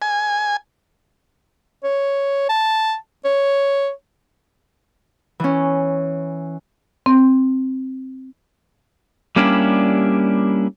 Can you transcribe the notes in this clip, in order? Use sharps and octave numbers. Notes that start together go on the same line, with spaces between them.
G#5
C#5
A5
C#5
E3 C#4
C4
G3 A#3 C#4 D4 E4 G4